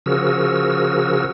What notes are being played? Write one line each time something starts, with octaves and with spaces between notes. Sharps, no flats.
C#3 F3 F#4 G#4 A#4 E6